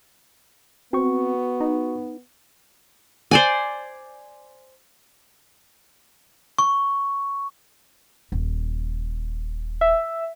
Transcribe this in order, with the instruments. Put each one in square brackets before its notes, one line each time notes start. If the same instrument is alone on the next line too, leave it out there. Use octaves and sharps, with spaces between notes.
[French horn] B3 [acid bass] C4 [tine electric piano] F#4 C#6
[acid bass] D#4
[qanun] C5 D5 G#5
[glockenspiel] C#6
[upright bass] D#1
[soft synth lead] E5